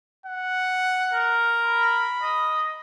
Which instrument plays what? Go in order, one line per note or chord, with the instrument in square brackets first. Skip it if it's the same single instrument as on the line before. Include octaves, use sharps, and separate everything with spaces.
[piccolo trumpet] F#5
[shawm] A#4
[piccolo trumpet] B5
[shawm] D#5